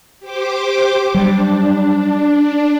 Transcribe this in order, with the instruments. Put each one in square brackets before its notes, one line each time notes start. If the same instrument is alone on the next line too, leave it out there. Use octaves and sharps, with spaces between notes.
[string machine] G4 C5 D6
[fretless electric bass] F#3 G3 [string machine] D4